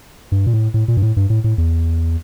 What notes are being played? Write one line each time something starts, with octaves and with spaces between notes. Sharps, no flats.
G2
A#2
A2
A2
A#2
G2
A2
G2
A2
A2
E2